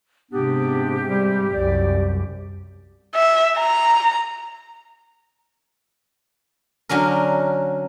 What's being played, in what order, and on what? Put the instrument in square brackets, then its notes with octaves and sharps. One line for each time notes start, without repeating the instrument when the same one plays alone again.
[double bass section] G#2 C3 [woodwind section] B3 D4 [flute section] G4
[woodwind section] G3
[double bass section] C2 F#2 [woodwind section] D5
[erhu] E5
A#5
[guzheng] D3 F#3 C#4 A#4